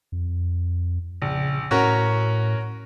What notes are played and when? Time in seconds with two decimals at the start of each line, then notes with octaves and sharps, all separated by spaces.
0.12 F2
1.22 A#1 C#3
1.71 A2 C#4 F#4 A#4